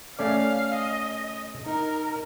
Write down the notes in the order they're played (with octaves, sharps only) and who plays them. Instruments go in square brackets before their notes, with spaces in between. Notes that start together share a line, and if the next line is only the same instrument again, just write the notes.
[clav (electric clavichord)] A3 C#4 D5 [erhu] F5
[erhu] D#5
[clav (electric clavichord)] D#4 [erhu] A#4